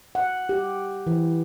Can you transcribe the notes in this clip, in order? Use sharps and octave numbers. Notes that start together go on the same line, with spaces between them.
F#5
G4
E3